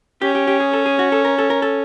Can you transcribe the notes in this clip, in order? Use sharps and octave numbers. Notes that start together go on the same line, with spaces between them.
C#4 G4
G4
G4
G#4
A4
G#4
F#4
A4
A#4
A4
A#4
A4